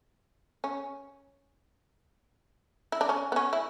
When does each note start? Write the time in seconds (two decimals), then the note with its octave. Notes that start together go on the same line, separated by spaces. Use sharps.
0.64 C#4
2.92 E4
3.01 D4
3.09 C#4
3.32 B3
3.36 C#4
3.53 E4